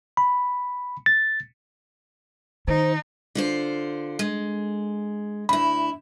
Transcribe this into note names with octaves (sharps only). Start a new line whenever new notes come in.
B5
A6
D#3 D#4 C5
D3 F4 C5
G#3
D2 E4 B5